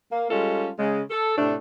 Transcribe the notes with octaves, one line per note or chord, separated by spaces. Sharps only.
A#3
G3 G#3 C#4 F4 A4
C#3 G#3
A4
A2 C3 A3 D4